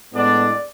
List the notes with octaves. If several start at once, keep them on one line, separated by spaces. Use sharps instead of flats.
A2 G#3 B3 D4 D5